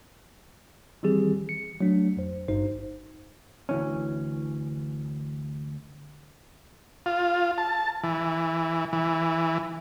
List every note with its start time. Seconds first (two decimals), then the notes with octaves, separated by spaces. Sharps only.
1.03 D#3 E3 G3 C4 G4 G#4
1.49 C#7
1.81 F#3 A3 D4
2.17 F2 C5
2.48 G#1 G2 D#4 C5
3.69 D2 E3 C#4
7.06 F4
7.58 A5
8.04 E3
8.93 E3